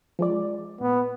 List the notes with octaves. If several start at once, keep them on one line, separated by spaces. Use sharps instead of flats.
F3 G#3 D5
A#2 B3